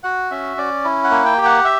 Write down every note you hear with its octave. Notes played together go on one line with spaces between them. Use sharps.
F#4 F#5
C#4 E5
C#4 D5
E4
F#5
A#3
G5
G4
F#5
E5